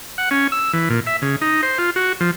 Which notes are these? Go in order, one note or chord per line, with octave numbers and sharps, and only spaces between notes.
F#5
C#4
E6
E3
A#2
E5
C#3
D#4
C5
F4
F#4
F3